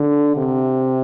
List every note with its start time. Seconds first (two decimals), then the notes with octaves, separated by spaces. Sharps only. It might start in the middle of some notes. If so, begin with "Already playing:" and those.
Already playing: D3
0.37 C3